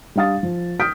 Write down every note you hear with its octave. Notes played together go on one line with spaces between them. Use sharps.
G3 D4 F5 D#6 A6
F3
D#6 F6 G6 B6 D7